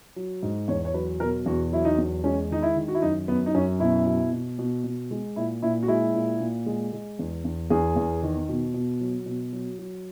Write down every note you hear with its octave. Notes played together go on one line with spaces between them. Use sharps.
F#3
G#2
E2 C#5
C#5
F#3 B4
B2 A#4
E2 F#4
F#3 E4
D#4
E2
G#3 C#4
D#3 D#4
E4
D#3
F#4
E4
F#2 D#4
F#2 B3
D#4
F#2 C#4
B2 E4
B2
B2
B2
B2
G#3
A#2 E4
A#2 E4
F#4
G#3 E4
A#2
A#2
G#3
G#3
E2
E2
E2 G#4
E2
D#3
B2
B2
F#3
B2
F#3
F#3